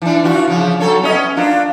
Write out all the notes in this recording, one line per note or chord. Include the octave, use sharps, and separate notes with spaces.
E3 D4
E3 F4 F#4
C#3 F3
F#3 A4 C#5
B3 C#4 D#5
A#3 D4 F4